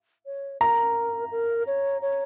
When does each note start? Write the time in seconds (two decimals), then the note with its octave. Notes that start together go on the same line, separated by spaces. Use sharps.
0.26 C#5
0.61 A#4 A#5
1.31 A#4
1.67 C#5
2.02 C#5